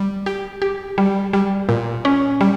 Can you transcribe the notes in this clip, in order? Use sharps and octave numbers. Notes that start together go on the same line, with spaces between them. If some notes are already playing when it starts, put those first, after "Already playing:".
Already playing: G3
G4
G4
G3
G3
A#2
C#4
G3